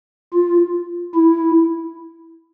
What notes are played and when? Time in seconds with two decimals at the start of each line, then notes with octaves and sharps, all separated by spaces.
0.33 F4
1.15 E4